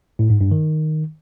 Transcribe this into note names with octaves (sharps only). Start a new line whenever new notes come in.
A2
G#2
G2
D#3